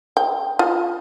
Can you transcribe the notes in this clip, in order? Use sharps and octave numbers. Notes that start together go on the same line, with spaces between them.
G5
F4